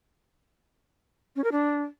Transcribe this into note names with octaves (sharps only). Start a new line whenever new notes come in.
C#4
A#4
D4